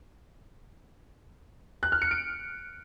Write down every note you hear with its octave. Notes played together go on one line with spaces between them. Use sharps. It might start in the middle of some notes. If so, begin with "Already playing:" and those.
F#6
F6
C#7
D7